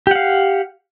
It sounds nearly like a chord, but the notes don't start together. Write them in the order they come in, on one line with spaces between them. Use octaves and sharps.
G4 F#5 F5